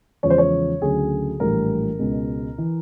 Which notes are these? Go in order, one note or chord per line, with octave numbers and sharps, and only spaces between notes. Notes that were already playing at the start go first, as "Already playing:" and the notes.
E2 C#3 F3 G#3 C#5
C5
C#5
D2 C#3 F#3 G#4
A#1 A2 E3 G3 A#4
C#2 B2 G#3
E3